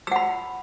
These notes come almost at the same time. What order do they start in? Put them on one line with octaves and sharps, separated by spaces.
E6 F#5 B5